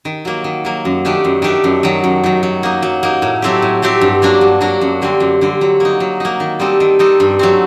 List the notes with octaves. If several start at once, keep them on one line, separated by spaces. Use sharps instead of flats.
D#3
F#3 A#3
D#3
F#3 A#3
F#2
D#3 A3 D4 G4
F#2
D#3 A3 D4 G4
F#2
D#3 F#3
F#2
D#3 F#3
F#3
A#3 D#4
F#3
A#3 D#4
A2
F#3 A3 C4 G4
A2
F#3 A3 C4 G4
G2
F#3 A#3 D4 F#4
G2
F#3 A#3 D4 F#4
F#2
D3 G3 C4
F#2
D3 G3 C4
F#3
A#3 D#4
F#3
A#3 D#4
D#3
G3 C4 D#4 A4
D#3
G3 C4 D#4 A4
G2
F#3 A3 C4